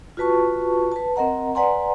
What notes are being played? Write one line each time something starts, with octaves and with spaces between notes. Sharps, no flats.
F4 F#4 B4 A5 C#6
B4 A5
C4 A#4 D#5 F#5 A#5
B4 D5 F#5 G#5 A#5 C6